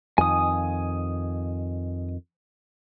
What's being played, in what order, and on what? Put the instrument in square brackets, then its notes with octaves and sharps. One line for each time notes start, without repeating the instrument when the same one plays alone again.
[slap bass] F2 D#3 [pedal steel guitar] G#5 D#6